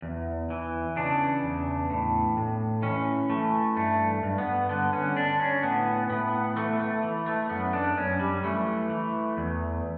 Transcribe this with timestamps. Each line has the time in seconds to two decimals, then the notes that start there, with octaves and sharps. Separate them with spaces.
0.02 E2
0.50 E3
0.96 C#3 D4
1.43 E2
1.90 A2
2.37 A2
2.82 E3 C#4
3.30 E3 A3
3.76 G2 A3
4.23 G2
4.38 B3
4.69 D3 B3
4.93 C#4
5.16 D3 D4
5.40 C#4
5.63 A2 B3
6.10 A2 B3
6.56 E3 A3
6.79 A3
7.03 E3
7.26 A3
7.49 F#2 B3
7.73 D4
7.97 F#2 C#4
8.19 G3
8.43 E3 A3
8.90 E3
9.37 E2